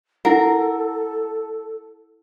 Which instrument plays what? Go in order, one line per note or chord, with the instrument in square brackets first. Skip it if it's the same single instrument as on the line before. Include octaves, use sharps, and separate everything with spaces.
[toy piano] E4 F#5 [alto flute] A4 [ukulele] A#4